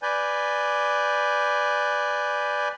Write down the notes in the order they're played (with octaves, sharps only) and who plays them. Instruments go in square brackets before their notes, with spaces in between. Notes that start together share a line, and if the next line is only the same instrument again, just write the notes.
[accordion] B4 D5 G#5 G6